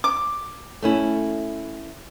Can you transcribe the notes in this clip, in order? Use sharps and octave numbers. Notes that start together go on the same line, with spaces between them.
D6
A3 C#4 E4